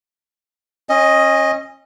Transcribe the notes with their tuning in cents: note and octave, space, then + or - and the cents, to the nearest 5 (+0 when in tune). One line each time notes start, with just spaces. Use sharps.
C#4 -30 D#5 +0